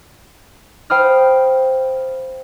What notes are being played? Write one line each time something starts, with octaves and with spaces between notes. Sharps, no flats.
C5 F5 G5 B5 D#6 F6